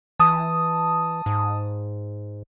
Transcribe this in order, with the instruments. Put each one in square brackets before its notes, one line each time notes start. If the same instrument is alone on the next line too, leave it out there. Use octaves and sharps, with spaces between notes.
[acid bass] E3 [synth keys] A5 D#6
[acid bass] G#2